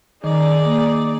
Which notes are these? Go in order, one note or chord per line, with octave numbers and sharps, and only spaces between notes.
D#3 D#4 G#4 D5
A#3